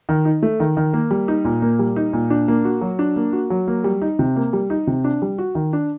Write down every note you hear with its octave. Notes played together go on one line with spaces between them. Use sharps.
D#3
D#4
A3
D#3
D#3
A#3
G3
D#4
A#2
A#3
G3
D#4
A#2
D4
A#3
F#4
F#3
D4
A#3
F#4
F#3
A#3
G3
D#4
C3
A#3
G3
D#4
C3
D4
G3
F#4
D#3
D4